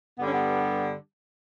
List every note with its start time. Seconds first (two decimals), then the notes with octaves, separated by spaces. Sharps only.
0.19 G2 D3 G3 B3
0.27 C#4
0.34 B3